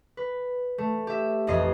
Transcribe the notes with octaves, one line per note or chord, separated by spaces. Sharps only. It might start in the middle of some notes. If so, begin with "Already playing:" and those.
B4
A3
G4 E5
A1 F2 D#5 C7